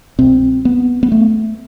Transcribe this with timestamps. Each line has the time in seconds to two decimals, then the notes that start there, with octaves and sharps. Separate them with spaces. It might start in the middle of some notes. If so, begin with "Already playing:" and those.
0.19 C2 B2 C4
0.65 B3
1.03 B3
1.12 A3